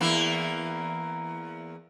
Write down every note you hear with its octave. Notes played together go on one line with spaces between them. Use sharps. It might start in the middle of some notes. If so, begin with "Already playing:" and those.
E2 A#3 E4